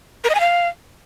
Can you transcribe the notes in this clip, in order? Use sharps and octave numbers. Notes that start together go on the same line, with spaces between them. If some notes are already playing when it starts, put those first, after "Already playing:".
A#4
D#5
G#5
F5